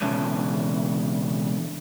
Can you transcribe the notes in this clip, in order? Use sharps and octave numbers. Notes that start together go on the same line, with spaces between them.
C#2 B2 D3 E3 C#4 A5